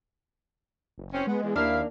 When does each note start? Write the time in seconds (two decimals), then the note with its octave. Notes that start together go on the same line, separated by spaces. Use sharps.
0.98 F#1
1.13 C4 C#4
1.27 G#3 B3
1.42 E2
1.56 D#2 A#3 D4 E4 E5 F5